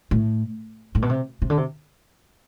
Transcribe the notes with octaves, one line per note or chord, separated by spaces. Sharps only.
A2
A2
B2
C3
C3
D3
C3